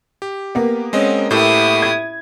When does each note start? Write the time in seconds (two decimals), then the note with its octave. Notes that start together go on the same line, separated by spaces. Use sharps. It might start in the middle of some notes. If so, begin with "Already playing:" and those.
0.22 G4
0.55 A#3 B3
0.93 G#3 C4 C#4 D#5
1.31 A2 E4 G4 A4 D#6
1.82 G#6